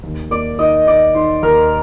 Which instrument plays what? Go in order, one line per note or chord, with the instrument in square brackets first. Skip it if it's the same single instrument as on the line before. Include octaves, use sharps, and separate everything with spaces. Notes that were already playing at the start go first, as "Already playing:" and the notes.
[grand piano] D#2
[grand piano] A#3 [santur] D5
[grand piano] D#3 [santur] D#5
[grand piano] D#3 [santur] D5
[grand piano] D#3 [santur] C5
[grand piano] D#2 [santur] A#4